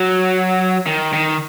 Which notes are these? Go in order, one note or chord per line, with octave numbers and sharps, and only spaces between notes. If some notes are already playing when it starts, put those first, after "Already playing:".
Already playing: F#3
D#3
D#3